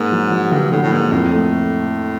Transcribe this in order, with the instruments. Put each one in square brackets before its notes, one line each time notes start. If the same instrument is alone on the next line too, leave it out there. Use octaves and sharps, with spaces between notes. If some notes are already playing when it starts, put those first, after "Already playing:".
Already playing: [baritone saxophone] G#2 [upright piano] A#3
[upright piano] F#3
F#3
[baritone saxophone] G2 [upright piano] D3
[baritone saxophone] A2 [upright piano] D3
[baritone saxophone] A2
[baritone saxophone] G#2 [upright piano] A#3
[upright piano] F2 [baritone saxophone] A2
[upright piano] A3